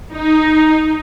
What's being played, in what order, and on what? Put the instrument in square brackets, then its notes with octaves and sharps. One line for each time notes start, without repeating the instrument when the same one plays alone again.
[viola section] D#4